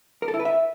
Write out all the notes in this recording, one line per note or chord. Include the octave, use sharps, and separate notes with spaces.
A#4
A4
E4
B4
E5